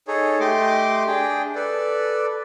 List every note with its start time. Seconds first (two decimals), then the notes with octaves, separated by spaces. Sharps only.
0.08 D#4 G#4 A4 C#5
0.40 A3 G4 D#5 C6 D6
1.07 D4 G#4 G5
1.55 A4 B4 D5